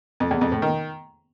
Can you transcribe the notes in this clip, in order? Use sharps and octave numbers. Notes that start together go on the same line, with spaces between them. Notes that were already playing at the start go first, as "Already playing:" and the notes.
F2
E2
F2
A2
D#3